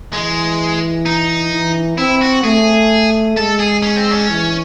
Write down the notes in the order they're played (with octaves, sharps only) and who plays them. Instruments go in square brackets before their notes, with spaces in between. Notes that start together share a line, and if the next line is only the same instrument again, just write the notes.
[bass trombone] E3 [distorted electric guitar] G#3
[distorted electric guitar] D#4
[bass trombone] E3
[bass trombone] C4 [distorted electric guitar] E4
[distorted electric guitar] F#4
[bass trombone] A3 [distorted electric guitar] G#4
[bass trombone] G#3 [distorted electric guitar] A4
[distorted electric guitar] G#4
C#4
C4
C#4
[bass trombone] E3